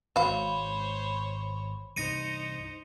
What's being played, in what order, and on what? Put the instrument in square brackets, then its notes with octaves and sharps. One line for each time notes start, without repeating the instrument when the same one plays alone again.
[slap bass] G#1 G#2 [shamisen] F#4 F5 [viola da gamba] C5 C#5 [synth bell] B5
[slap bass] C2 G2 G3 [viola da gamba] D#4 C5 [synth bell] A#6 C#7 D#7